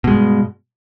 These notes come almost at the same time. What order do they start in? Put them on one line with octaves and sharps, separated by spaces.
B2 G#3 G2